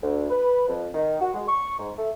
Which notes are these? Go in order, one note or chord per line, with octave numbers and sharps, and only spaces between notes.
D2
B4
F2
D#3
F#4
G#3
C#6
G#2
A3